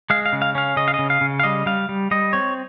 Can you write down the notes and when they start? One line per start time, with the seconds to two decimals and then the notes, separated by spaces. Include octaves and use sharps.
0.10 G#3 F5
0.26 F5
0.33 C#3
0.42 F5
0.55 C#4 F5
0.77 C#3 D#5
0.88 F5
0.94 C#3 D#5
1.10 F5
1.21 C#3
1.40 F5
1.43 G3 D#5
1.66 G3 F5
1.89 G3
2.11 G3 D#5
2.33 C4 C#5